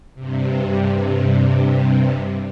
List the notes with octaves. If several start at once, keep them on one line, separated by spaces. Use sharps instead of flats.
G2 C3